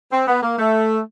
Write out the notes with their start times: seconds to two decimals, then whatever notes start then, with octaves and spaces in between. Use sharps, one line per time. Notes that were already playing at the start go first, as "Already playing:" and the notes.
0.13 C4
0.28 B3
0.43 A#3
0.59 A3